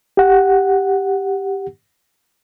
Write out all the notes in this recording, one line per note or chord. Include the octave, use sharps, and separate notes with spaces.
G4 F#5